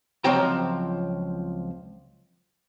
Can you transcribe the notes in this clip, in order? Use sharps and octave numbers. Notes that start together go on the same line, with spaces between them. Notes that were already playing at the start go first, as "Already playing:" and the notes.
C#2 F3 F#3 C4 G5 A#5